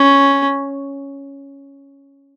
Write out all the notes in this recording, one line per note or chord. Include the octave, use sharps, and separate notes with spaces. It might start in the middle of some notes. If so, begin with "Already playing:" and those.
Already playing: C#4